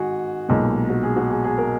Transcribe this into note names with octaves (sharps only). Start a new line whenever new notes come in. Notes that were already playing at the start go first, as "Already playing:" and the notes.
Already playing: G#2 D#3 F#4 G#4
B1 A#2 G#3
F#4
G#4
F#4
G#4
G#4
A#4